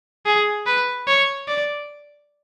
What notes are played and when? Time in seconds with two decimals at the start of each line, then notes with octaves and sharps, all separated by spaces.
0.26 G#4
0.66 B4
1.07 C#5
1.48 D5